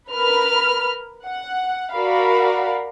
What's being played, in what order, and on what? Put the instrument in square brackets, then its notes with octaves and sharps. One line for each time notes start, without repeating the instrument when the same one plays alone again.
[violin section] A#4 B4 B5 F6
F#5
F#4 A#4 D5 F5 B5